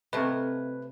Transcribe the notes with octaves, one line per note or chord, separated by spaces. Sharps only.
C3 A3 C4 B4 D#5